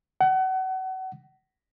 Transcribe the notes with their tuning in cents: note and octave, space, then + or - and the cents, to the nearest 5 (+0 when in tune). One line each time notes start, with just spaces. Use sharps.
F#5 +30